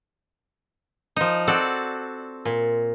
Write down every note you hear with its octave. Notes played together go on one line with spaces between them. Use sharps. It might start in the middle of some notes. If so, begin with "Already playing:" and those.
F3 D#4
C4 F#4 A4 D5
A#2